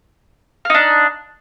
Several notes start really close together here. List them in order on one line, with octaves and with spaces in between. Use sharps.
F5 D#4 D4